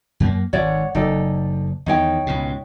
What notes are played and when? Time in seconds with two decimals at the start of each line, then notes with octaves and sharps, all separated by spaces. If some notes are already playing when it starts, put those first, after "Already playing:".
0.20 F#2 A#3
0.53 G#1 G#2 C#5 D5 F#5
0.95 F#1 D#4 A4 D5
1.86 E2 D#3 D#4 C#5 G5
2.27 C#2 G#2 B2